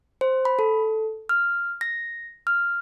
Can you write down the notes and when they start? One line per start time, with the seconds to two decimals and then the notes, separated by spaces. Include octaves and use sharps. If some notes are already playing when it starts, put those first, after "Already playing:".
0.21 C5
0.45 B5
0.59 A4
1.29 F6
1.81 A#6
2.47 F6